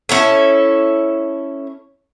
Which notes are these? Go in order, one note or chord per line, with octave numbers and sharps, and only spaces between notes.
C#4 E4 A4